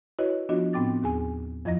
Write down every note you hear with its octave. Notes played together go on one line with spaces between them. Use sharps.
E4 F#4 B4 C#5 D#5
F3 B3 D4 F4 F#4 D#5
A2 B3 C4 G5 D6 A6
D#2 G#4 G#5
F2 F3 E4 D#5 A#5 A#6